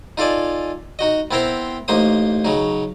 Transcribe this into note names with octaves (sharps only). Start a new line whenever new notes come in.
D#4 F4 A4 D5 G#5
D#4 F#4 D#5
B3 C4 E4 A#4 C5 G5
A1 A#3 D#4 C5 D#6
C#3 F#3 D#4